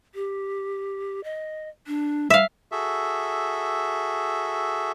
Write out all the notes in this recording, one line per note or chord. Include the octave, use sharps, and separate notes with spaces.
G4
D#5
D4
G3 E5 F5
F#4 G#4 A4 E5